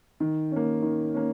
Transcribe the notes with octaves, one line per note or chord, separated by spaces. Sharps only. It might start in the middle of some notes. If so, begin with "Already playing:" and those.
D#3
C#4
A#3
D#3
A#3 C#4